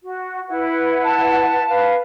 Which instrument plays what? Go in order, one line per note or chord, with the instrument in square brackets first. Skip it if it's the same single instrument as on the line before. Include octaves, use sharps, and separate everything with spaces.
[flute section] F#4
E4 B4 F#5
[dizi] A5
[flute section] B4 F5